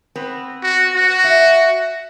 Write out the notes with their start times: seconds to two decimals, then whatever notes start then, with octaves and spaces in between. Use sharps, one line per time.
0.16 B3 C4 B4
0.63 F#4
0.96 F#4
1.24 E5